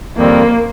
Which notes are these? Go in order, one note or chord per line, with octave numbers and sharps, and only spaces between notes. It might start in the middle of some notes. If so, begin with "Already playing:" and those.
F2 D#3 G3 A#3 C4